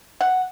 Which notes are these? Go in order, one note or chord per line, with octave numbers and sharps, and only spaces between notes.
F#5